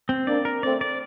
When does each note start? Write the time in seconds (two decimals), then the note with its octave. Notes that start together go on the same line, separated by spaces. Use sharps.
0.09 C4
0.27 A#3 D4 D5
0.45 A#4
0.63 A3 C4 D5
0.81 D5